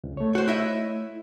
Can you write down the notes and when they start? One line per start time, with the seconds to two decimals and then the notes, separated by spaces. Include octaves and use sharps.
0.04 C#2
0.17 A3 C#5
0.35 F#4 C5
0.48 E4 D#5 E5